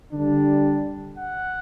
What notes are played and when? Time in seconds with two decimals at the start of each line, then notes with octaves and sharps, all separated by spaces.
0.10 D3 G3 D4
1.15 F#5